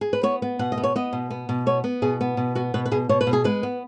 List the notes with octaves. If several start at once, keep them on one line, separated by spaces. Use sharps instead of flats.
G#4
B4
B3 C#5
B3
B2 F#5
D#5
B3
C#5
B3 D#5
B2
B3
B2
B3 C#5
B3
B2 G#4
B3
B2
B3 F#4
B2 B4
B4
B2 G#4
B2 C#5
B4
B2
G#4
G#3 B4
B3